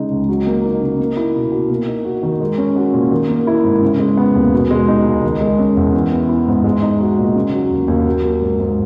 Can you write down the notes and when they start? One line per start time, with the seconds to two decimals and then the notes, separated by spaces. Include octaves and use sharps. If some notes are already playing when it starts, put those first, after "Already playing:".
Already playing: C#3 G#3 D#4
0.11 C#2
0.28 F#3
0.47 A#3
0.64 D#4
0.82 C#3
1.00 A#3
1.17 E4
1.35 B2
1.52 B2
1.70 A#3
1.88 D#4
2.05 F#4
2.23 D#3
2.40 G#3
2.58 C#4
2.76 F#4
2.94 A#2
3.11 D#3
3.29 A#3
3.47 E4
3.64 G#2
3.82 C#3
3.99 G#3
4.17 B3
4.35 D#2
4.53 B2
4.71 G#3
4.88 D#4
5.06 C#2
5.23 D#3
5.41 G#3
5.59 C#4
5.77 E2
5.93 E3
6.12 B3
6.29 E4
6.47 G#2
6.64 G#3
6.82 D#4
7.00 F#4
7.18 A#2
7.36 C#3
7.53 F#3
7.71 D#2
7.88 D#2
8.06 F#3
8.24 A#3
8.42 G#2
8.60 G#2